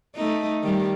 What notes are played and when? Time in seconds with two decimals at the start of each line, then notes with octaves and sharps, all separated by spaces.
0.15 A3 D#4
0.63 D#3 G3